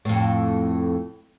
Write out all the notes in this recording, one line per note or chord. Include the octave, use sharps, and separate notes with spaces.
F2 A2